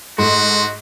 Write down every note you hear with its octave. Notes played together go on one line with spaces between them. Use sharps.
G#2 A3 F#4 C6